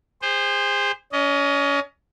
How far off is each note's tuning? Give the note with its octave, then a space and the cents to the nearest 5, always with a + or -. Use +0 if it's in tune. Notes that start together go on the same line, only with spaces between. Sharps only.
G#4 -35 C5 +0
C#4 +30 D#5 +0